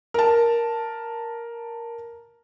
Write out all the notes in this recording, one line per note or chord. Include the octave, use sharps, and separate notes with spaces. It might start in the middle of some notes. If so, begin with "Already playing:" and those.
A#4 A5